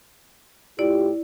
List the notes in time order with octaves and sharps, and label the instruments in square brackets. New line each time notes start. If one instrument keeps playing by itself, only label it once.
[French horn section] A2 F4 G4 [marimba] E4 D5